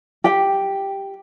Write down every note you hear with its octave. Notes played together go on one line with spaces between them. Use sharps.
G4 G5